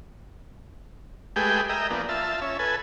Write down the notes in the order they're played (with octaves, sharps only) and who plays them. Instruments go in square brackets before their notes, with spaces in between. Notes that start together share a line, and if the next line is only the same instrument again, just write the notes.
[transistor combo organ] G#3 A3 G4 G#4 B4 G5
A#4 D#5 E5 G5
F3 A#3 B3 D4
F4 E5 A5
C#4 E5
A4 B4 G#5